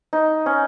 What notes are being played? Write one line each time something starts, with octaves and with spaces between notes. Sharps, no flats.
D#4
C#4